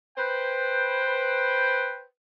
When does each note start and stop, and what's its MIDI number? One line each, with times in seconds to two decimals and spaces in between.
0.18 2.06 71
0.18 2.06 72
0.18 2.06 79